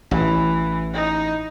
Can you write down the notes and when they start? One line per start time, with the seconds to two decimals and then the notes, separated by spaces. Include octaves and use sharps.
0.11 A1 E3
0.94 D#4